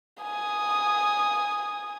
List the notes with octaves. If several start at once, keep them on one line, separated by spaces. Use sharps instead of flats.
G#5 D#6